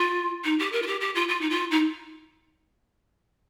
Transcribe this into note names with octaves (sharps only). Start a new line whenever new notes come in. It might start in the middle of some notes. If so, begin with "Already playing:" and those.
Already playing: F4
D#4
G4
A#4
F4
G4
G4
F4
F4
D#4
F4
D#4